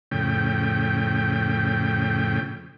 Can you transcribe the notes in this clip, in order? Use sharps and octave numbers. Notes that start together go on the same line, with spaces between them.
F2 A2 C#3 G5